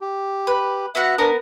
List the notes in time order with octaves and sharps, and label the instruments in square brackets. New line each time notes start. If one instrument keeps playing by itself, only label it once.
[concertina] G4
[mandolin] B4
[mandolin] B3 F#4 F#5 [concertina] E5
[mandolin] B3 A#4 D#6 [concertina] D4